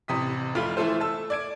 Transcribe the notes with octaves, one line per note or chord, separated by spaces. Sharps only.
A1 C3 D#6 B6
F1 A3 F4 B5
E3 A3 E4 F4 A4 C5
A3 A5 E6
D5 G#6 D7